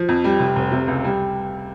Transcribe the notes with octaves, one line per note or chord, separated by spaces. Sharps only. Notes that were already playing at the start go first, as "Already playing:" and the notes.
Already playing: F3
F2
G3
F1
F1
C3
C#2
G3